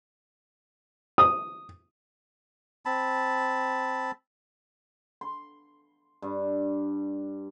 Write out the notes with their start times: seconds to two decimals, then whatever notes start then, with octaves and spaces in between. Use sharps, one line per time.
1.18 D#6
2.86 C4 A5 B5
5.21 C6
6.22 G2